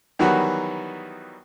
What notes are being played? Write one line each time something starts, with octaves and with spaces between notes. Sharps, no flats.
D#3 E3 F#3 G3 B3 F#4